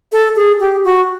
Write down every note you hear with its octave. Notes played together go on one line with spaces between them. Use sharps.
A4
G#4
G4
F#4